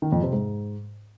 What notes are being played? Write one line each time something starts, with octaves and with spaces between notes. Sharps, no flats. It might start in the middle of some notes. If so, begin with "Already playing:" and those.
D#3
F2
C3
G#2